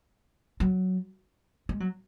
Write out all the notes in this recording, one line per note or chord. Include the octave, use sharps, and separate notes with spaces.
F#3
G#3
F#3